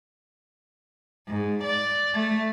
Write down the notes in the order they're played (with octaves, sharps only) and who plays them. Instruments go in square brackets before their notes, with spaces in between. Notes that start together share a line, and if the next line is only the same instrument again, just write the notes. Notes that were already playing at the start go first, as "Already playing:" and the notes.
[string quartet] G#2
D5
A3